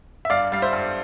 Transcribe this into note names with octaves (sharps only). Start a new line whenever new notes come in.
E5
G2 D5 F5
G3 F5
C5 E5
G2